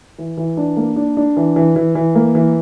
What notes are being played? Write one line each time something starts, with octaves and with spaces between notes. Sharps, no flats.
E3
E3
D4
A#3
D4
D4
E3
E3
E3
E3
A#3
E3